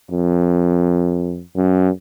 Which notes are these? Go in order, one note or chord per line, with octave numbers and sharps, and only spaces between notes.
F2
F#2